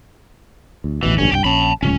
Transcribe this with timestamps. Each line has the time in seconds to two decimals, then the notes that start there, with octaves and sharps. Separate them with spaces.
0.84 D2
1.03 A1 D#2 B2 E3
1.18 A#1 G2 D3 C#4
1.32 C2 G2 G4 G5
1.44 A#1 C#4 A5 B5
1.83 D1 C#2 C#4